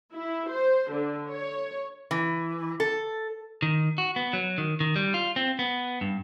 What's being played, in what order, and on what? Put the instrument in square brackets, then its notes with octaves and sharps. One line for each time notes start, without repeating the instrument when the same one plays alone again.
[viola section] E4
C5
D3
C#5
[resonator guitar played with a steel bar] E3
A4
[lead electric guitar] D#3
F#4
B3
F#3
D#3
D#3
G3
F4
C4
B3
G2